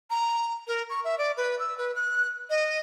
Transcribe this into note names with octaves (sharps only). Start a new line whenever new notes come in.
A#5
A#4
C#6
E5
D5
B4
E6
B4
F#6
D#5